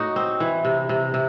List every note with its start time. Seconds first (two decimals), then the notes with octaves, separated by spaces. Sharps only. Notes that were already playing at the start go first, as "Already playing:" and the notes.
Already playing: A2 D#4 F#4
0.16 C4
0.40 E3
0.65 C3
0.89 C3
1.14 C3